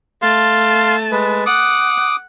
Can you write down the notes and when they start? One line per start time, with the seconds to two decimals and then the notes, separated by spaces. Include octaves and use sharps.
0.22 A3 F5 A5 C6
1.12 G#3 B4
1.46 F#5 D6 D#6